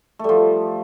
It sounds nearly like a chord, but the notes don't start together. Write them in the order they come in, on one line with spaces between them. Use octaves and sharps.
A3 G3 F3